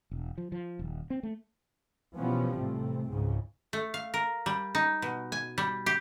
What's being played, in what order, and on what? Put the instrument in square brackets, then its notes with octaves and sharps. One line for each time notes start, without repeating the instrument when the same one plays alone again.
[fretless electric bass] E1
F3
F3
D#1
C4
A3
[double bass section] B2 E3 F3 G3 B3 C#4
A1 C3 A3 C4
C#2 G#2 C#3
[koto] A3
F5
A#4
G3
D#4
B2
G#5
G3
G4